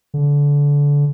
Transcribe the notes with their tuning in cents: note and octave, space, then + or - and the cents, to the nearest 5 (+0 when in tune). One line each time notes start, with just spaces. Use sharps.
D3 -25